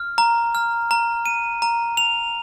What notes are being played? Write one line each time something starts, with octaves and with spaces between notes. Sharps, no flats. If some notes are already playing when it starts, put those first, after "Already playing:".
Already playing: F6
A#5
F6
A#5
D#7
A#5
F7